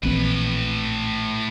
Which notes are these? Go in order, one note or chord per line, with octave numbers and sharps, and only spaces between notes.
A#1 A2 E3 C4 B4